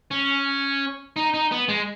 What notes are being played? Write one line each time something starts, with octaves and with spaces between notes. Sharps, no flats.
C#4
D#4
D#4
B3
G#3